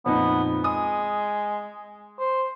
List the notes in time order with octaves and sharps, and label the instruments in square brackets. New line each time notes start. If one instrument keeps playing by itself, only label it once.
[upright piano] F2 A#2 D#4 [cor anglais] B3
[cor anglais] G#3 [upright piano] D#6
[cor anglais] C5